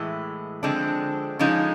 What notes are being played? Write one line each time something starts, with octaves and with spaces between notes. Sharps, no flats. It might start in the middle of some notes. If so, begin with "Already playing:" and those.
Already playing: A2 E3 G#3
D3 F3 G#3 C4 D4
D3 F3 G#3 C#4 D#4